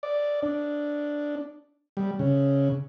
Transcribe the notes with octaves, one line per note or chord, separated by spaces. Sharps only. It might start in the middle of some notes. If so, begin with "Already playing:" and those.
D5
D4
G3
C#3